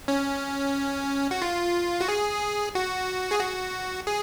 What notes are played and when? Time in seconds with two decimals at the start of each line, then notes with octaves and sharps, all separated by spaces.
0.08 C#4
1.31 F#4
1.42 F4
2.01 F#4
2.08 G#4
2.75 F#4
3.31 G#4
3.40 F#4
4.07 G#4